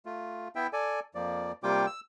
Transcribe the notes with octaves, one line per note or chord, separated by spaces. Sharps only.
A3 F4
B3 E4 E5 G5
A4 D5 G#5
F2 F3 A#3 D5
C3 G3 A#3 F4 G5 D6
E6